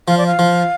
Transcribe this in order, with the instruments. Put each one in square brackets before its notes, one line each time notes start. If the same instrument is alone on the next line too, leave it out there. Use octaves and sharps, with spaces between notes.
[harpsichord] F3 [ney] F5
[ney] D5
F5
[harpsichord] F3